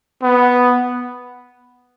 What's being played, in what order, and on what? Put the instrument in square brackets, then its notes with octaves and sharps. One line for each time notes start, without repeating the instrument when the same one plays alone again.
[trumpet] B3